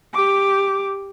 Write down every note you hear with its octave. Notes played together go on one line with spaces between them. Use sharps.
G4 D6